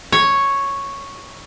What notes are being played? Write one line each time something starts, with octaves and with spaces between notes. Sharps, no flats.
C#5